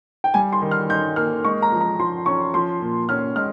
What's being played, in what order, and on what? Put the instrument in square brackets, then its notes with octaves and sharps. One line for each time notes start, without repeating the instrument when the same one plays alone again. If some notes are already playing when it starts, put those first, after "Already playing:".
[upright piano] G5
[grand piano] G3 [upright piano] G#5
[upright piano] C6
[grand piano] D#3
[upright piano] F6
[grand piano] D#4 [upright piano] G6
[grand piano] A#3 [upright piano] F6
[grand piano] G#3 [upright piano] C#6
[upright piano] A#5
[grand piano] F3
[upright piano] A#5
[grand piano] F3 [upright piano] C6
[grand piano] C#4 [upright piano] C#6
[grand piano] F3 [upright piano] C6
[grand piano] A#2
[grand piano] C#4 [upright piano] F6
[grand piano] G#3 [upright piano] F6